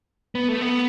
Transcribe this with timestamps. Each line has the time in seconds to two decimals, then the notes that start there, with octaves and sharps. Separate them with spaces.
0.35 B3
0.48 A3
0.61 B3